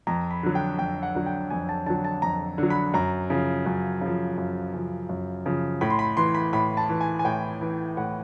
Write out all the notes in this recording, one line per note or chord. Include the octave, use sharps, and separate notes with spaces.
F2 A#5
B5
D3 F#3
G5
F2 G5
F#5
D3 F#3
G5
F2 G#5
A5
D3 F#3 A5
A5
F2 A#5
D3 F#3
B5
F#2 A#5
C#3 F3
F#2
C#3 F3
F#2
C#3 F3
F#2
C#3 F3
A2 B5
C6
B5
E3 C6
B5
A2 B5
A5
E3
G#5
G#5
A2 G5
E3
A2 F#5